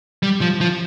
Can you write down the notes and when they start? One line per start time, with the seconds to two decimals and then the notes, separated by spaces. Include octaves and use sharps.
0.23 G3
0.41 F3
0.61 F3